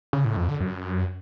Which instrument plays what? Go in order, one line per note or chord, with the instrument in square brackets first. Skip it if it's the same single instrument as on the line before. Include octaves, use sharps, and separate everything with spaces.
[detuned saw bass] C#3
A2
F2
D3
F#2